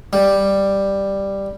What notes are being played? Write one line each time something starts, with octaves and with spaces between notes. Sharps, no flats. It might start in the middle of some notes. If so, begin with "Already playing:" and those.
G3